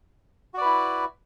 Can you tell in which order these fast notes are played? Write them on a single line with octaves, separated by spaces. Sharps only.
F#4 D5 B4 E4